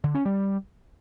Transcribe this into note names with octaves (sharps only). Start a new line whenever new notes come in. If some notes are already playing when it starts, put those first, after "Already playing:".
D3
C#4
G3